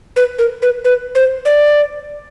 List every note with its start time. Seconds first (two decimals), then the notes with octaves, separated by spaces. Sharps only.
0.16 B4
0.39 A#4
0.62 B4
0.85 B4
1.15 C5
1.45 D5